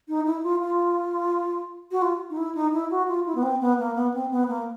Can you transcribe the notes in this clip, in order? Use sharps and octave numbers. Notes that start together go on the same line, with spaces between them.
D#4
E4
F4
F4
F#4
F4
D#4
E4
D#4
E4
F#4
F4
E4
B3
C4
B3
A#3
B3
C4
B3
A#3